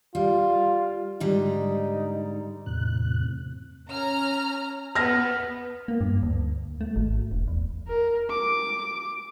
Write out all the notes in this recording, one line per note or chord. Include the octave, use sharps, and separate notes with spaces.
G3 F4
G#2 D3 G3 D#4
E2 A2 C3 F#6
C#4 A#5 F6
B3 F6 A#6
A#3
G2
D2
A3
G#1
E1
E2
A#4
D6